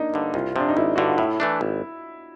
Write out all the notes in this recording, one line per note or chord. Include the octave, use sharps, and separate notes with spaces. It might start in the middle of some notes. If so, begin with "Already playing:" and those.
Already playing: A#3 D4 D#4
G2 D3
C2 F4
C3 F3 D4
D#4
G#1 E4
G2 D3 F#4
F4
A2 E4
E3 A3 D4
G#1